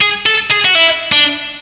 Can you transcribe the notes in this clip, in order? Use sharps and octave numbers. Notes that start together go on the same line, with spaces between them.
G#4
A4
G#4
F#4
E4
D4